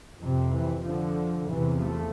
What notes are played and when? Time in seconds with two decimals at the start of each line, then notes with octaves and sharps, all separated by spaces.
0.20 F2 C3
0.52 E3
0.84 D3 F3
1.49 E2 C3 E3
1.82 F3 A3